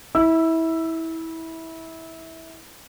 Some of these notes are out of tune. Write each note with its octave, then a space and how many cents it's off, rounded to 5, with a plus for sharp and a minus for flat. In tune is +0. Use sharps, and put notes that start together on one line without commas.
E4 -20 E6 +10